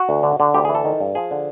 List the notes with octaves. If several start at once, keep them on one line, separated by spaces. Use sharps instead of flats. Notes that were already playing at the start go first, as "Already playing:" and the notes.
Already playing: F#4
D2
D3
D3
D2 G4
G#4
E3
A4
D#3
G2
F3 G#4
D3